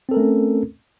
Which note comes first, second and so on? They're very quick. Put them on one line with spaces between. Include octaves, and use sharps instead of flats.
C4 A4 A#4 A3 C#4